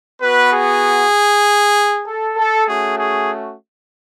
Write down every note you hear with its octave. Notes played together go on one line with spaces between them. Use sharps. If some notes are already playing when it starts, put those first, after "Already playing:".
B3 F#4 B4
G#4
A4
A4
A3 C#4 F#4 G#4
G#4